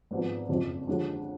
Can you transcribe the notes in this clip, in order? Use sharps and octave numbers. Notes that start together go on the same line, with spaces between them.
G#1 G#2 F3 B3
F#1 F2 F3
D#2 D3 F3 G#3 D4